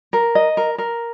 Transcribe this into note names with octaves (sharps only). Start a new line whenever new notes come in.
A#4
D#5
A#4
A#4